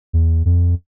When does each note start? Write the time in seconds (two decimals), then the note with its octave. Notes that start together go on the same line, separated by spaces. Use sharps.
0.13 E2
0.45 F2